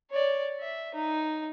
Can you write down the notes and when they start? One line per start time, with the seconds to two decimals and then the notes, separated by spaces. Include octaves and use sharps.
0.11 C#5 D5
0.60 E5
0.94 D#4